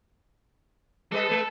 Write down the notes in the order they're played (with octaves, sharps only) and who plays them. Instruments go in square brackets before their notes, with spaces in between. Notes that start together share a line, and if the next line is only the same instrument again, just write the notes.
[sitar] G3 B4 D#5 [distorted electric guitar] A4
[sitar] G#3 B4